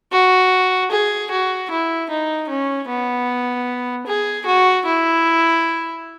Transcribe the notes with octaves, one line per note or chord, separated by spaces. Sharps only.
F#4
G#4
F#4
E4
D#4
C#4
B3
G#4
F#4
E4